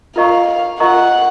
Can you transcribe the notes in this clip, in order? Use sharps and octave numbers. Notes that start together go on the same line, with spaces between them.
F4 A#4 D#5 F5 A#5 C#6
F4 A#4 D#5 F#5 A#5 C#6